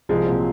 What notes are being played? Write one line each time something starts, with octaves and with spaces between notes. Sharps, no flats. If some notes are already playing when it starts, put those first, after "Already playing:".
C2 F3 G#3
A#2 F#3 C4